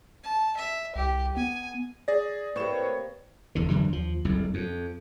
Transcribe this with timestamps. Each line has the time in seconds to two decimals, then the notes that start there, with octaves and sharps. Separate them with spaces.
0.24 A5
0.57 E5
0.96 C2 G4
1.37 B3 G#5
2.08 G#4 D5 A6 A#6
2.56 A2 A#3 C4 G4 B4 C#5 C#6 E7
3.55 F1 E2 D3
3.70 F#2 D3 E3 G3
3.88 D#2 F3
4.25 F#1 C2 F2
4.54 F2